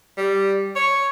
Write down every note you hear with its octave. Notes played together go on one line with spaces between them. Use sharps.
G3
C#5